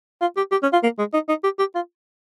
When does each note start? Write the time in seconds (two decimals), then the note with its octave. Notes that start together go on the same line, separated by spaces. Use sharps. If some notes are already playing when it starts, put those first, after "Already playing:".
0.21 F4
0.37 G4
0.51 G4
0.63 C#4
0.73 F4
0.83 A#3
0.99 G#3
1.14 D#4
1.29 D#4
1.44 G4
1.59 G4
1.75 F4